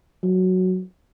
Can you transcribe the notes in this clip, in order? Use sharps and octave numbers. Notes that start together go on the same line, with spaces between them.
F#3